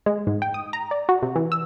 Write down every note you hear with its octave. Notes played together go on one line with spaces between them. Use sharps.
G#3
G#2
G5
D#6
A#5
D5
F#4
C3
E3
E6